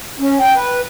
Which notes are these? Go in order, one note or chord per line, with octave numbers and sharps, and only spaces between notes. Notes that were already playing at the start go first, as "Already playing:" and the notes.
C#4
G5
B4